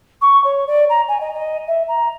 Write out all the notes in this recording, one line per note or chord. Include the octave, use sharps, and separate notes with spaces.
C#6
C#5
D5
A#5
G#5
D#5
D#5
E5
A#5